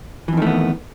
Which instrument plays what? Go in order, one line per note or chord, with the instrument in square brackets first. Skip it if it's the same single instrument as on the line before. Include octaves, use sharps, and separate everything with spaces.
[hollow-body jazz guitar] E3
F2
D#3
A3
B3